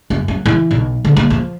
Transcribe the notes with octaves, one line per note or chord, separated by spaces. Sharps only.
F#2
F#3
E3
B1
D3
A#3
F3